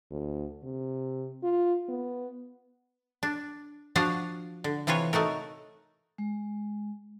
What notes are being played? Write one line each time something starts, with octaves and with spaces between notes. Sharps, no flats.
D2
C3
F4
B3
D4
F3 D4 F#4 F5 F#5
D3
C3 E3 F4 B4 C#5
A3 D#4 F#4 A#4
G#3